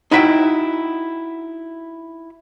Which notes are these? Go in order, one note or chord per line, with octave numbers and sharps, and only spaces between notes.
D#4 E4 F#4 E5 F5 G5